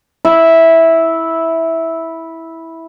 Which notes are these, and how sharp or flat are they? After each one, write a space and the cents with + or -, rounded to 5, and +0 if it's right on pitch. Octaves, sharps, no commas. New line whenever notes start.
E4 -10